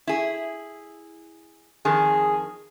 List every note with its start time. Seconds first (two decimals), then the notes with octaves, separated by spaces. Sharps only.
0.07 E4 G#4
1.85 F2 D#3 G#4